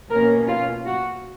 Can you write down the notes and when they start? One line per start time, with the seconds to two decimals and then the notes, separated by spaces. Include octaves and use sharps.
0.11 B2 A#3 C#4 A#4
0.48 F4
0.86 F#4